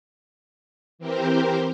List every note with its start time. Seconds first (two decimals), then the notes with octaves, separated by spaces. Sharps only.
0.99 E3 C4 G4 A#4 C5